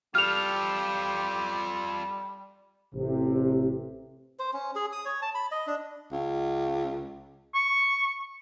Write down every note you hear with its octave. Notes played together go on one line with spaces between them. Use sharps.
G3 F4 G4 A4 F6 F7
A1 C3
C5
C#4
G#4
D#6
C#5
A5
B5
D#5
D4
C#2
C#6